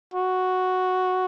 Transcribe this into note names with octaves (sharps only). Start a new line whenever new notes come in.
F#4